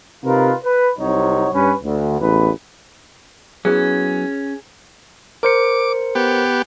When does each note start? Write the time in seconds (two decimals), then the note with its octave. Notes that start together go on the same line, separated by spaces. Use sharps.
0.24 C3 D#4 F4 A#4 B4
0.63 B4
0.99 C2 C3 F#3 D#4 C#5
1.54 G2 C#4 B4
1.84 D2
2.20 A1 E2 B4
3.65 F#3 B3 C#4 E4 G#4
5.43 A#4 C5 D6 C#7
6.15 B3 G4